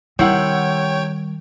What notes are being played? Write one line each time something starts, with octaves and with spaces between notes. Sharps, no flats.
C3 D#3 G3 E4 C#5 F#5 G5